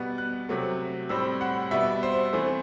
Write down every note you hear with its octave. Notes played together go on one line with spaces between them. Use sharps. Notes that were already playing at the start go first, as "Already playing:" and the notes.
Already playing: B2 G3 B3 F#6
F#6
C3 F#3 A3
A2 G3 C4 E6
F#5
B2 G3 B3 E5
C5
E3 A3 C4